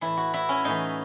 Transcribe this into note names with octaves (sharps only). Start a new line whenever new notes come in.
A2 E3 E4
F#4
E4
C#4
A2 E3 D#4